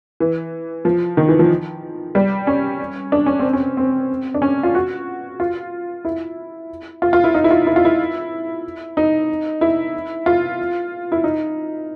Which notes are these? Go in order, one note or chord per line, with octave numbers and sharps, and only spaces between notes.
E3
F3
D#3
E3
F3
G3
C#4
D4
C#4
C4
C#4
C4
D4
C#4
F4
F#4
F4
E4
F4
F4
E4
D#4
E4
F4
E4
F4
E4
D#4
E4
F4
E4
D#4